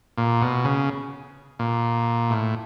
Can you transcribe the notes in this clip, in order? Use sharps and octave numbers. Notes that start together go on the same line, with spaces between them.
A#2
B2
C#3
A#2
A2